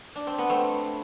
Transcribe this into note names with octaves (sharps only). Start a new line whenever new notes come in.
D4
C4
B3
A3 C4